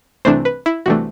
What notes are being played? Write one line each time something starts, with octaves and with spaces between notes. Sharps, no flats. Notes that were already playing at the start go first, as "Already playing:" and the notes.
C2 C3 E3 A3 D4 C5
B4
E4
C2 C3 E3 A3 D4 F#4